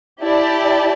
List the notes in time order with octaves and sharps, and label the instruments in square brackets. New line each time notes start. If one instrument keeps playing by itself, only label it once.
[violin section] E4 G4 D5 A5